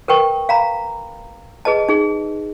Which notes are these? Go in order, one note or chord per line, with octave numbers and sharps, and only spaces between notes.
A#4 B4 G5 C#6
F5 A#5 B5
G#4 B4 D#5 A5
D#4 G#4